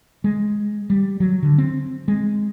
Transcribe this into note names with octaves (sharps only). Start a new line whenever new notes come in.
G#3
G3
F#3
D3
C4
G#3